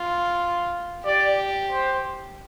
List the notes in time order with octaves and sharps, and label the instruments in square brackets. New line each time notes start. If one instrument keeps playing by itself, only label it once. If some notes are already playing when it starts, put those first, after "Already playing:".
Already playing: [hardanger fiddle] F4
[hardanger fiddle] G4 [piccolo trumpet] D5
[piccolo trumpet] C5